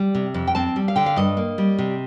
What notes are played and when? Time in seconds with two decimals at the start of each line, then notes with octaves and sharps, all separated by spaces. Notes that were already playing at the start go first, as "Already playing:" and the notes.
Already playing: G3
0.15 C3
0.34 F2
0.47 G5
0.55 C4 A5
0.76 G3
0.88 F5
0.96 D3 G5
1.06 F5
1.16 G2 D#5
1.37 A#3
1.58 G3
1.79 C3